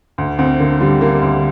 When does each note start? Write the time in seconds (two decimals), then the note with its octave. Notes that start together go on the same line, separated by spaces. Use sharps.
0.18 D2
0.39 D2 C4
0.59 D3 A#3
0.81 D3 G3
1.01 D3 A#3
1.22 D2